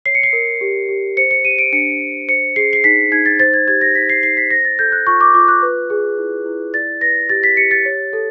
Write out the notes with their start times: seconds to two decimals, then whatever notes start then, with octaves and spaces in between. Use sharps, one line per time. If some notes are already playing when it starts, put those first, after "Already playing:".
0.06 C#5 C7
0.15 C#7
0.23 C7
0.33 A#4
0.61 G4
0.89 G4
1.17 C5 C#7
1.31 C#7
1.45 G4 D#7
1.59 D7
1.72 D4 C#7
2.01 D4
2.28 C5 C#7
2.56 G#4 C7
2.73 C7
2.84 D#4 B6
3.12 D#4 G#6
3.26 A6
3.39 C5 A6
3.54 G#6
3.67 G4 G#6
3.81 A#6
3.95 D#4 B6
4.09 C7
4.23 D#4 C7
4.37 B6
4.51 C5 A#6
4.65 A6
4.79 A4 G6
4.92 F#6
5.07 F4 C#6
5.21 D6
5.34 F4 D6
5.48 F#6
5.62 B4
5.90 G#4
6.18 E4
6.46 E4
6.74 D5 A6
7.01 B4 A#6
7.29 G4 A6
7.43 B6
7.57 G4 C#7
7.71 A6
7.85 C#5
8.13 A4